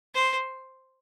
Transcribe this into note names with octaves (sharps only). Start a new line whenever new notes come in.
C5